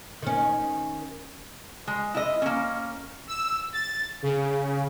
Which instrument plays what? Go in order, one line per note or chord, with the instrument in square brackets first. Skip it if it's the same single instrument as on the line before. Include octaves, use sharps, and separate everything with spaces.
[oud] D#3 C#4
[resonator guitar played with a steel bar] G#3
E4 D#5
A#3 C#4
[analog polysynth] E6
A6
C#3